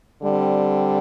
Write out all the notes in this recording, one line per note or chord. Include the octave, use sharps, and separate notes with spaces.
D3 G3 C4